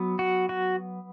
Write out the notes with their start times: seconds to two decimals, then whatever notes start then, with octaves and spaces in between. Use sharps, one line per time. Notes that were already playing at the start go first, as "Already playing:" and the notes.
Already playing: F#3 B3
0.19 F#4
0.49 F#4